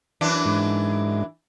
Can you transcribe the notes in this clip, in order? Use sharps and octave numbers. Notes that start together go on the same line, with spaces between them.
F#2 E3 D4
G#2